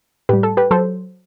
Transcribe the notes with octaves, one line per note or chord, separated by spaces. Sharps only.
A2 G3 G4 B4
A4
G4 B4
F#3 A4 C5